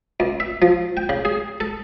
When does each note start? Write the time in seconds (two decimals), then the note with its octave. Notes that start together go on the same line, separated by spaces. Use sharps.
0.20 C#2
0.40 E5
0.62 F3
0.97 G5
1.09 C#3
1.25 G#4
1.60 A4